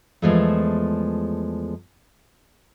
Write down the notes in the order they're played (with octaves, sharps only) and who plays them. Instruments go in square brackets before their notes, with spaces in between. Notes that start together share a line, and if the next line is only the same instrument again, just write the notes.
[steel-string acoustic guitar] E2 F3 G#3 A3